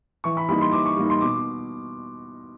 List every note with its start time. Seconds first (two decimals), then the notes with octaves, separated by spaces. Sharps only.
0.24 E3 C#6
0.37 B5
0.49 G3 A#3 D#4 B5
0.61 C6
0.72 E3 D6
0.86 C#6
0.96 G3 A#3 D#4
1.10 C6
1.21 B2 D6